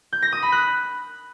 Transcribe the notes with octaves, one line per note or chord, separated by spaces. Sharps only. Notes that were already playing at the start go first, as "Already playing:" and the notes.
G6
A#6
D#6
B5
F#6